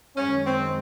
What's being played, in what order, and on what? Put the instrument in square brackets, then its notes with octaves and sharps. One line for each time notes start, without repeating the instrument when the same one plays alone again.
[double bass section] F#2 D#3 G#3 [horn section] C#4
[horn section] C4